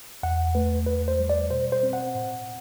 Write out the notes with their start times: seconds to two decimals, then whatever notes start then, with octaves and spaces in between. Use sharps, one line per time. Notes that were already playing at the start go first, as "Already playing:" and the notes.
0.23 E2 F#5
0.55 A3 B4
0.86 E2 B4
1.08 C5
1.19 G3
1.30 D5
1.51 B2 C5
1.72 C5
1.83 C4
1.93 F#5
2.15 A2